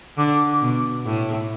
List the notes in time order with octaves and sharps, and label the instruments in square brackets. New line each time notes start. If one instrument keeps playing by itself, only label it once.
[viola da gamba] D3 [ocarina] D6
[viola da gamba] B2
A2